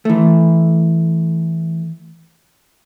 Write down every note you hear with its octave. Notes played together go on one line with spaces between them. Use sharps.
E3 A3